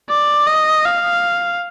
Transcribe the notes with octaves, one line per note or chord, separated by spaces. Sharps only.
D5
D#5
F5